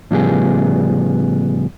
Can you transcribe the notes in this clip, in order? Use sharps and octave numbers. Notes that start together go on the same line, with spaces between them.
A2 C#3 F3 G3 B3 G#4